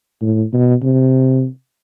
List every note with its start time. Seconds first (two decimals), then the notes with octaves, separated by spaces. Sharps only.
0.22 A2
0.53 B2
0.83 C3